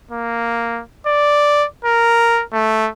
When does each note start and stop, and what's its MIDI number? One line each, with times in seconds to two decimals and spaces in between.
0.11 0.81 58
1.06 1.65 74
1.84 2.43 70
2.53 2.89 57